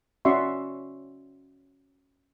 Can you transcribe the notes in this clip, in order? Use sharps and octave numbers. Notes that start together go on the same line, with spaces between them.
C#4 F#4 D5 E5 C6 C#6